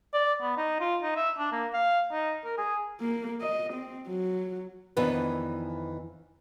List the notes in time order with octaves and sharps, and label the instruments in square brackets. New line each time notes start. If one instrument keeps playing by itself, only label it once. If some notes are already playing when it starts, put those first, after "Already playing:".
[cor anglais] D5
B3
D#4
F4
D#4
E5
D4
A#3
F5
D#4
A#4
G#4
[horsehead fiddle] A#3
D#5
C4
F#3
[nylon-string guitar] F2 D#3 E3 B3 D4 B4